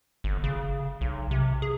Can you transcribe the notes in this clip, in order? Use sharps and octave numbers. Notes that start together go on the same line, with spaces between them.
G1
C#3
B1
C3
G#4